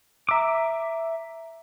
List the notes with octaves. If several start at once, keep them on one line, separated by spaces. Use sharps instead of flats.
E5 A#5 D6 E6